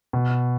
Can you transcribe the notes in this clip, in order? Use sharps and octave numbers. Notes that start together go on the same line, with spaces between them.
B2